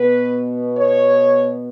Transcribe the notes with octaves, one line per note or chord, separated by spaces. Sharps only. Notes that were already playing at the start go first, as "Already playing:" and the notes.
Already playing: B2 B3 B4
C#5